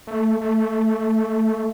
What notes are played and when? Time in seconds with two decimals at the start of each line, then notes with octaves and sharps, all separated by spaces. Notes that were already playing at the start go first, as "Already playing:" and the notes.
0.07 A3
0.41 A3